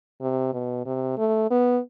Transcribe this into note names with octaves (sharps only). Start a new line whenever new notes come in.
C3
B2
C3
A3
B3